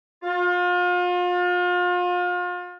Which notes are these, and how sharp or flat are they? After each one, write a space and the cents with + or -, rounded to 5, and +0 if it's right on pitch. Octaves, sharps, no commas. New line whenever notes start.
F4 +35